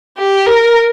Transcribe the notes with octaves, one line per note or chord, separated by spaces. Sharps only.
G4
A#4